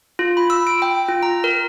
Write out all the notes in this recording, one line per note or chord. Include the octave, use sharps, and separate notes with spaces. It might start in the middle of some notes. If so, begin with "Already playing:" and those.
F4
B5
E6
D7
G5
F4
A#5
A#4